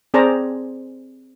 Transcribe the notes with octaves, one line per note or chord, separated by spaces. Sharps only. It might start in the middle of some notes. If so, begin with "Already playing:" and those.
C4 G#4 C5 D5 A5 A#5